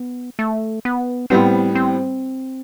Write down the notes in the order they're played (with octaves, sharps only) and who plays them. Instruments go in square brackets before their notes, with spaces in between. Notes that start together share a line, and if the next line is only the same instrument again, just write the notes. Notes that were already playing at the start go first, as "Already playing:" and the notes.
Already playing: [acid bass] B3
A3
B3
[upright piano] A2 G3 B3 [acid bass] C4
[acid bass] C4